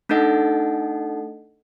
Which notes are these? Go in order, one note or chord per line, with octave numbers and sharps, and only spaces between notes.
A3 D4 D#4 A4 D#5 F#5